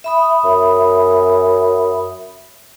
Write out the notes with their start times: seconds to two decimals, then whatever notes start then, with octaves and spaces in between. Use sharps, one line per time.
0.04 E5 B5 D#6
0.45 F#2